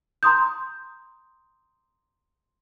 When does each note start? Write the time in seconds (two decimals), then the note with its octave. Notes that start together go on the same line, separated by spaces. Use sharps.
0.23 A#5 C6 D#6 G6